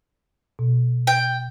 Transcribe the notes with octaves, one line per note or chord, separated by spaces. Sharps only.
B2
G5